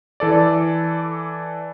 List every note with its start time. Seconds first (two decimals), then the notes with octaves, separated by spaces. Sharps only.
0.20 E3 A4 D5